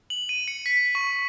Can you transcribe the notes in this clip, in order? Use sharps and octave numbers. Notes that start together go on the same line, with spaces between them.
F#7
D#7
C#7
B6
C#6